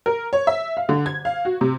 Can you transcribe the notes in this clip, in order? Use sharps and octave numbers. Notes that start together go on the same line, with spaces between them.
A#4
C#5
E5
F5
D3
G#6
F5
F#4
C3